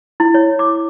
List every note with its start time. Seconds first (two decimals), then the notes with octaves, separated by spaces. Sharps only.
0.20 E4
0.34 C#5
0.59 D6